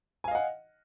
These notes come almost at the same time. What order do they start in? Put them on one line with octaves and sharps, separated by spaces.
G#5 F5 D#5 F#5